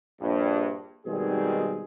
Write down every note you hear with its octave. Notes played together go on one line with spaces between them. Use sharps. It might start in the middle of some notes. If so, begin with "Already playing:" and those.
A#1 G2
G#1 B2 D#3 G3 C4 G#4